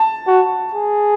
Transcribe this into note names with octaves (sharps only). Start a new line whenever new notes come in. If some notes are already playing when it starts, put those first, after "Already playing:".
Already playing: A5
F#4
G#4